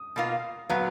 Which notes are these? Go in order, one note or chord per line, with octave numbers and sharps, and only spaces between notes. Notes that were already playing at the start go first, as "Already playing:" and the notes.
Already playing: D#6
B2 A#3 F4
A#2 F#3 B3 F5